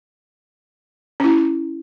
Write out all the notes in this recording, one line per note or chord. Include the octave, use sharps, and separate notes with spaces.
C#4 E4